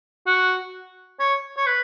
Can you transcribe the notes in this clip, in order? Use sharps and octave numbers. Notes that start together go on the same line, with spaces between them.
F#4
C#5
C#5
B4